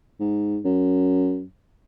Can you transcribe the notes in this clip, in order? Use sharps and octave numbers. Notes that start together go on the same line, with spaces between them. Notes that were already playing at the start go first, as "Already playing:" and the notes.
G#2
F#2